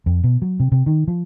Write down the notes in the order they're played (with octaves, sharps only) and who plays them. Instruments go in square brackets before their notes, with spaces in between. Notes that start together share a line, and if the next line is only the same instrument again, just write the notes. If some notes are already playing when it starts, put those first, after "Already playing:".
[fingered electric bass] F2
B2
F#3
C3
C3
D#3
F3